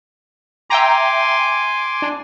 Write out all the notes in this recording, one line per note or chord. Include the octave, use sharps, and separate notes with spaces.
E5 G5 G#5 A#5 C6 D6
D4